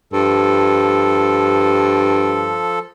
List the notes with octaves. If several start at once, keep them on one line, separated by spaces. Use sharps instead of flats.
G2 F3 A4